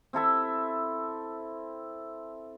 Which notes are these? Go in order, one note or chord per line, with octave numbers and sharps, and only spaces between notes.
C4 E4 A4 E5